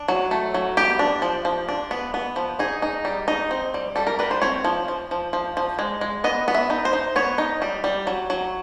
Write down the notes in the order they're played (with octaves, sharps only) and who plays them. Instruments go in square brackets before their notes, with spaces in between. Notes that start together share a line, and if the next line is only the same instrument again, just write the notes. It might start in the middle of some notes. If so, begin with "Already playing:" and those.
Already playing: [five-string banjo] D4
F#3
A3
F#3
B3 G4
D4
F3
F3
D4
B3
B3
F3
D#4 G#4
D#4
G3
D#4
C4
G3
G3 A4
A#4
G3 B4
C5
C4 C#5
F3
F3
F3
F3
F3
G#3
G#3
B3 D#5
B3
E5
D#4
C5
D#4
B3 C#5
D#4
G3
G3
F#3
F#3